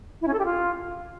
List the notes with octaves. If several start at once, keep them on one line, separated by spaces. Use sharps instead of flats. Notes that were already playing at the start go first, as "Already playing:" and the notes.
E4
C#4
A4
G4
F4